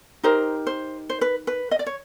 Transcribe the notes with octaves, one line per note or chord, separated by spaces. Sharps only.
D#4 G4 A#4 C5
C5
C5
B4
B4
D#5
D5
C#5